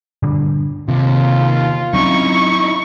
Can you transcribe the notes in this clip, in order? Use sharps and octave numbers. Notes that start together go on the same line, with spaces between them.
G2 A#2 D3
D#2 C3 F4
F#3 C4 C#4 D#4 E4 C#6